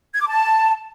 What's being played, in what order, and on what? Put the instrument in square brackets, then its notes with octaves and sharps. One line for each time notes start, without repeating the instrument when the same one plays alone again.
[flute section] G#6
D6
A5